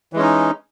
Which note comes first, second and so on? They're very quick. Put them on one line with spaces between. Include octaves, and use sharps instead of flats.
E3 G#3 C#4 D#4